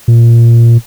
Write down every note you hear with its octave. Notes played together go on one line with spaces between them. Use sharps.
A#2